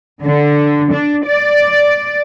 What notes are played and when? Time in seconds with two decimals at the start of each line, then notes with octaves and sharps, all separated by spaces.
0.24 D3
0.92 D4
1.25 D5